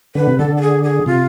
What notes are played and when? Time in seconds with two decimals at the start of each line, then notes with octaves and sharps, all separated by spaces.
0.15 D3 B4
0.27 C3
0.38 D3 A4
0.57 A4
0.61 G#4
0.83 G#4
1.06 C3 F4